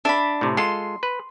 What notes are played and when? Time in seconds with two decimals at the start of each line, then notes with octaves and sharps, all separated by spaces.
0.05 D4 E5 B5
0.41 A2 C3
0.57 G#3 F4 A4 C6
1.03 B4